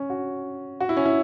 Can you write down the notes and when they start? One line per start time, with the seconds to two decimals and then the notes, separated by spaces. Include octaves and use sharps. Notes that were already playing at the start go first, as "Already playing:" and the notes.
Already playing: C#4
0.10 F#4
0.80 F#4
0.89 E4
0.97 C#4
1.06 E4